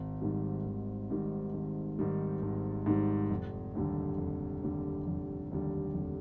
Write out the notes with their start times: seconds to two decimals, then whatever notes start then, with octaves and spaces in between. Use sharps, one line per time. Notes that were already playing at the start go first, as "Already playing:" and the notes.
Already playing: G#1
0.21 G#2 D#3 G3
0.66 G#1
1.10 G#2 D#3 G3
1.54 G#1
1.99 G#2 D#3 G3
2.42 G#1
2.86 G#2 D#3 G3
3.31 F1
3.75 D#2 D3 G3
4.18 F1
4.63 D#2 D3 G3
5.07 F1
5.51 D#2 D3 G3
5.94 F1